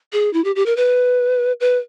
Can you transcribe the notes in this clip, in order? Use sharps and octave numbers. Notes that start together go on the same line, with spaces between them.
G#4
E4
G4
G4
A#4
B4
B4